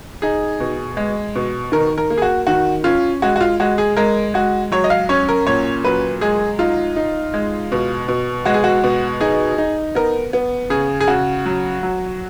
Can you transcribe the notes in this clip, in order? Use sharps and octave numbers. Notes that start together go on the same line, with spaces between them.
D#4 G#4
B2
G#3
B2
D#3 A#4
A#4
A#3
G#4
F#4
D#3 F#4
C#4 F4
G#3 F#4
F#4
F4
G#3 F#4
G#4
G#3 A#4
G#3 F#4
F#3 C#5
D#5
F5
C#4 C#5
A#4
A#2 C#5
F#3 B4
G#3 G#4
D#4 F4
D#4
G#3
B2
B2
G#3 F#4
G#4
F#4
B2
D#4 G#4
D#4
B3 A#4
B3
C#3 G#4
G#4
C#3 F#4
F#3
F#3